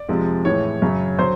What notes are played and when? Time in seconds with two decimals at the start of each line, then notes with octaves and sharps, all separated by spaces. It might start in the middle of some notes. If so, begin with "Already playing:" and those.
Already playing: D5
0.09 F2 C3 F3 G#3
0.45 A2 E3 G#3 C#5
0.82 F#2 C#3 F#3
1.19 D3 F#3 C5